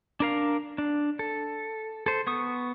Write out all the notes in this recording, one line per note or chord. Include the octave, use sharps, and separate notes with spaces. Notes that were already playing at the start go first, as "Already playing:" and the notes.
D4 A#4 F5
D4
A4
A4 C5
B3 C#6 D#6